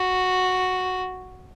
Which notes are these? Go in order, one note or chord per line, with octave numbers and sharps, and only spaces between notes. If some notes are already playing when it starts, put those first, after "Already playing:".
Already playing: F#4